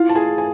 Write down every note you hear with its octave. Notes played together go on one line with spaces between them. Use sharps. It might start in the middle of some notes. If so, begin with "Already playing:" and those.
Already playing: E4 F4 F5
A5
G#4 G#5
G#5